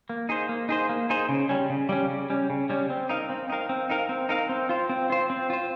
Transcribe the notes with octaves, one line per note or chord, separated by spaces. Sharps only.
A#3
D#4 G#4 C5
A#3
D#4 G#4 C5
A#3
D#4 G#4 C5
C#3
G3 C#4
C#3
G3 C#4
C#3
G3 C#4
C#3
G3 C#4
C4
D#4 A#4 F5
C4
D#4 A#4 F5
C4
D#4 A#4 F5
C4
D#4 A#4 F5
C4
F4 C5
C4
F4 C5
C4
F4 C5